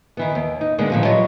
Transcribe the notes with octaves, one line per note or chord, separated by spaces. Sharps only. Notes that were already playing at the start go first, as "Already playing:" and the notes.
D#3 E3 B3
D#2
D#4
D3 G#3 A#3 B3
A#2 D3 E3 F3
F#3 G3 F4 D#5